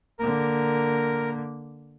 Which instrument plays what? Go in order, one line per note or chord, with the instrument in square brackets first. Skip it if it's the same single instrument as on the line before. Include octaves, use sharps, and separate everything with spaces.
[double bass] D3 A#3 [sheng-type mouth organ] A#4